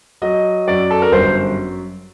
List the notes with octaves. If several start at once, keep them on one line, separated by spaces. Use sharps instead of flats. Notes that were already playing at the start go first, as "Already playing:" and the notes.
F#3 D#5
F#2 D5
A4
A#4
G1 C5